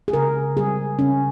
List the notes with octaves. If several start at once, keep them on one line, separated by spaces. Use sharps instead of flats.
G#4
C#3 A#4
G3 C4 G#4
C#3 C#4